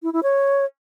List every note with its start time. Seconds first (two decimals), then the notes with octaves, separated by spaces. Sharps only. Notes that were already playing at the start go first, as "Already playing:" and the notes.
0.03 E4
0.13 E4
0.23 C#5